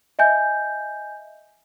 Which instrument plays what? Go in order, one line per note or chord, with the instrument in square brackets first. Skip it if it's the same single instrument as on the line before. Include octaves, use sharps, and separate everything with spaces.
[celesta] D#5 E5 G#5 G6